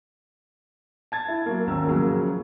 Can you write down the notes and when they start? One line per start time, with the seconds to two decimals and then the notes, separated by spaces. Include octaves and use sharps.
1.12 A5 G#6 A6
1.28 E4
1.46 F#3 A#3
1.67 G#1 D#2 C#4 A#4 E6
1.87 C#3 F3 F#3 A#3